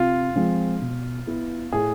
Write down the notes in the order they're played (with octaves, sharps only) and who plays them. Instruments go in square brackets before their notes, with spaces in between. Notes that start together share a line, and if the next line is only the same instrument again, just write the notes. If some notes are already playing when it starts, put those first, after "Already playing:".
Already playing: [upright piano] C3 [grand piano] F4
[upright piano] F3 G#3 C4
B2
B3 E4
[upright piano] A2 [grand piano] G#4